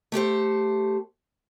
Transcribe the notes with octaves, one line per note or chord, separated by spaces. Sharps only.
A3 G4 A4 C5